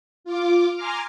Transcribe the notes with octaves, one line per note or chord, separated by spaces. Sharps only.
F4 D6
G#5 A#5 C6 D6 F6